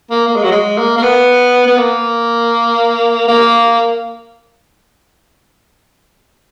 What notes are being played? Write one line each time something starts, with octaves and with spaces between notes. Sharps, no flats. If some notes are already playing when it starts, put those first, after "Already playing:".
A#3
A#3
G#3
F#3
G#3
A#3
A#3
B3
B3
A#3
A#3